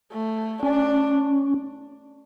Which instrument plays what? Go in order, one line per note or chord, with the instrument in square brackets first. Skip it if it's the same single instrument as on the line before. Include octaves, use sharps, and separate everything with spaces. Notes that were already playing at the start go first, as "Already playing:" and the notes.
[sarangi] A3
[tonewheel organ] C#4 [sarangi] D4